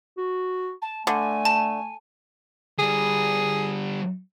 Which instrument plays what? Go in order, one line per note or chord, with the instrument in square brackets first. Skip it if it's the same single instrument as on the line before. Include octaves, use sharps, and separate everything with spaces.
[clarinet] F#4
[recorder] A5
[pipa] D3 [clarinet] A3 [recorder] G#5
[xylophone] A5
[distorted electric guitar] D3 G3 [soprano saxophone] G#4